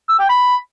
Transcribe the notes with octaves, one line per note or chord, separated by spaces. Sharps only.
E6
G5
B5